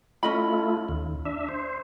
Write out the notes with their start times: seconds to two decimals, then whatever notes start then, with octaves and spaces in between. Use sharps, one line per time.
0.23 A3 C#4 E4 F4 D#5 B5
0.89 D#2
1.25 D4 E5
1.49 C5